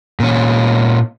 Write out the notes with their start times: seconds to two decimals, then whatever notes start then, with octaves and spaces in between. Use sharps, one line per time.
0.20 A#2 C#4